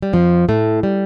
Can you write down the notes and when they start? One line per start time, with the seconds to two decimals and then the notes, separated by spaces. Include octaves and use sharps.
0.02 G3
0.13 F2 F3
0.49 A2 A3
0.83 G3